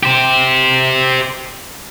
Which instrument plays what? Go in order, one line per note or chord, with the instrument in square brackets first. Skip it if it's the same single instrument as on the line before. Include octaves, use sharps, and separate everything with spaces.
[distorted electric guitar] G4 C5